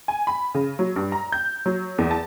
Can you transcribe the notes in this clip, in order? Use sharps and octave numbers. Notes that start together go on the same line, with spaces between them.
G#5
B5
C#3
F#3
G2
A#5
G6
F#3
E2
A5